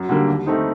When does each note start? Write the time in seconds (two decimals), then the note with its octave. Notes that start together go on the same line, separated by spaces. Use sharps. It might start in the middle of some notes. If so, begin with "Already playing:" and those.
Already playing: F#2
0.09 D3 G3 A#3
0.28 D#2
0.46 D#3 A3 C4 D#4